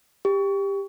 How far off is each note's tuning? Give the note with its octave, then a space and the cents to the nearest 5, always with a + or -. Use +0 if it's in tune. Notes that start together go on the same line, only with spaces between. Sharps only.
G4 +15